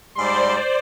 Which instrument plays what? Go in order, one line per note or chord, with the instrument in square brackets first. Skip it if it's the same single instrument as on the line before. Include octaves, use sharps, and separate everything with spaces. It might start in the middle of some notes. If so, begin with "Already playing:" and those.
[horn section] G#2 G3 C6 [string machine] C5 D5